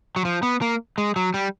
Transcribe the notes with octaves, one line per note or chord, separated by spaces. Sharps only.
F#3
F3
B3
A#3
G#3
F#3
G3